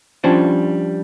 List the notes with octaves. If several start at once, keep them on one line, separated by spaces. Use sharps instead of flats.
F3 G3 C#4 D4 C5